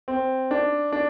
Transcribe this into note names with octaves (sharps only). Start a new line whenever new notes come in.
C4
D4
D4